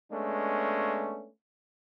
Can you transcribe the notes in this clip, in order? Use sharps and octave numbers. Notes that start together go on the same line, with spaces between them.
G#3 A3 B3 C#4 D4